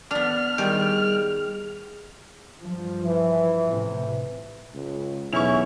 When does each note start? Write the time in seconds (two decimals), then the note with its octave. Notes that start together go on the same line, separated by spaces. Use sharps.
0.11 B3 D4 F6
0.58 D#3 G3 G#4 D5 G5
2.59 G2 F3
3.04 E3
3.65 A2 C3
4.74 C#2
5.33 B1 E2 C#4 E4 C#6 F7